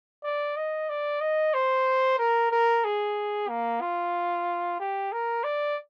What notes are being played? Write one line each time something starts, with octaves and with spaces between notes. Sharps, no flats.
D5
D#5
D5
D#5
C5
A#4
A#4
G#4
A#3
F4
G4
A#4
D5